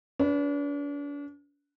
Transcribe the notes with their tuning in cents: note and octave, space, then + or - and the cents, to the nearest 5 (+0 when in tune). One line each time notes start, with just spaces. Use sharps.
D4 -40 F#4 -35 B4 +0